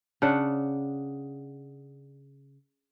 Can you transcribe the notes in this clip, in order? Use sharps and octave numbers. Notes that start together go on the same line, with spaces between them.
C#3 D4 F#5